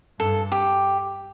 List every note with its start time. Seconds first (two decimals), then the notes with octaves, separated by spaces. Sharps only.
0.19 G2 A4
0.52 G4